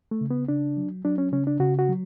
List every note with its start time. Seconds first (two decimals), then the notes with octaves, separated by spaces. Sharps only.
0.11 A3
0.21 C#3
0.30 B3
0.48 C#3 D4
0.77 F#3
1.05 F#3 D4
1.18 C#4
1.32 C#3 C#4
1.47 D4
1.60 C#3 F#4
1.79 F#4
1.89 F#3